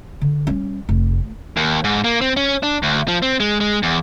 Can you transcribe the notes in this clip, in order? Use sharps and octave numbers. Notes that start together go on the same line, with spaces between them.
D3
G3 C#4
F1
D#2
G#2
A#3
C4
C#4
D4
D2
F3
C4
G#3
G#3
E2